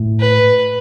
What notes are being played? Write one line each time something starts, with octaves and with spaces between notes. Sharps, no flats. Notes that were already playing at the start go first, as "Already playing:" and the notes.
Already playing: A2
B4